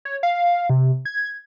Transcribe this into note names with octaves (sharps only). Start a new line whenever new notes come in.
C#5
F5
C3
G#6